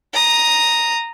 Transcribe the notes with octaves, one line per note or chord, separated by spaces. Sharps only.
A#5 D#6